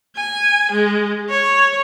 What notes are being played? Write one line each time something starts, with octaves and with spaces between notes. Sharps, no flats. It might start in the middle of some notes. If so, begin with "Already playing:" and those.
G#5
G#3
C#5